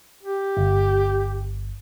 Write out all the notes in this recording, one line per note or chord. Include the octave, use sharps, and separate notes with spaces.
G4
G1